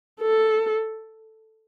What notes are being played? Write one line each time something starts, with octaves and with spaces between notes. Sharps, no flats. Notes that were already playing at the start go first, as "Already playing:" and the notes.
A4